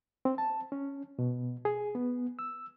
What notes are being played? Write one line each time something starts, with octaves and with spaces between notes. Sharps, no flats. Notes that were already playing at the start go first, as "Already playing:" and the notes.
C4
A5
C#4
B2
G#4
B3
E6